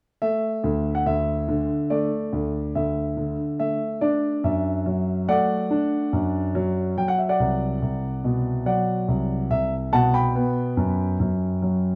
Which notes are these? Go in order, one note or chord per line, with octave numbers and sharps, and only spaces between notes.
A3 E5
D2
F#5
D2 E5
D3
A3 D5
D2
D2 E5
D3
A3 E5
D4 D5
F#2 E5
F#3
A3 D5 F#5
D4
F#2
F#3
F#3 G5
F#5
E5
D5 F#5
C2
C2
B2
F#3 D5 F#5
C2
C2 E5
B2 F#5 A5
G5 B5
B3
F#2
F#2
F#3